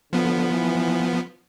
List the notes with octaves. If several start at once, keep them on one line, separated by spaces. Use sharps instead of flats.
D3 F3 B3
E3